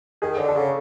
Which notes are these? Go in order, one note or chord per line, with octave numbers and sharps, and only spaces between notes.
D#3 G#4
D3
A4
C#3